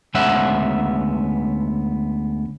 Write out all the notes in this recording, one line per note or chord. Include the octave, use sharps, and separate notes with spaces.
D2 G#3 B3 C#4 E5 F#5